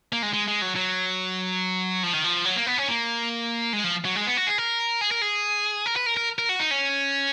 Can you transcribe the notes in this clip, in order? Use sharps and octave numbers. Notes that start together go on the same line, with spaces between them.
A#3
G#3
G#3
G#3
F#3
F#3
F3
D#3
F3
F#3
A#3
B3
C#4
A#3
G#3
F3
F#3
G#3
B3
F#4
G#4
A#4
G#4
A#4
G#4
A#4
B4
A#4
A#4
A#4
F#4
D#4
C#4